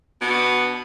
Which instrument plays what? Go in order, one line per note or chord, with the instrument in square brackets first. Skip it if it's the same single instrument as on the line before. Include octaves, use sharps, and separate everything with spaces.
[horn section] B2 B3 D4